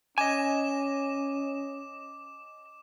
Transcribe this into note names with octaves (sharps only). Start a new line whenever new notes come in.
C#4 D#5 G#5 D6 E7